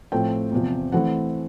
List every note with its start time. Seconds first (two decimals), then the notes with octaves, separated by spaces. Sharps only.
0.12 A2 F3 A3 C4 G5
0.52 E2 C3 F3
0.92 E3 A3 C4 F#5